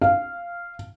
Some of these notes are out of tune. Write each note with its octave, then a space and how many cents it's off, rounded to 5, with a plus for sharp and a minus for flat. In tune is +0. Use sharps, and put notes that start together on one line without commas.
F5 -10